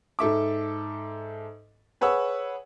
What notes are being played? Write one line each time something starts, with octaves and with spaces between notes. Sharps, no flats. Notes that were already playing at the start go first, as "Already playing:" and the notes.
G#2 A4 E5 D6
G#4 B4 C#5 F#5 E6